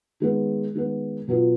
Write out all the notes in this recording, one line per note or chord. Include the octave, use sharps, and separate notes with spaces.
D#3 G#3 B3
D#3 G#3 B3
B2 F#3 B3 F4